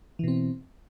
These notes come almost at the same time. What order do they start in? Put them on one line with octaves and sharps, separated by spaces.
E3 B2 C4